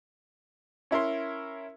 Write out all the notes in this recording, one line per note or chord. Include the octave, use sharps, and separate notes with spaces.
C#4 E4 A#4 C6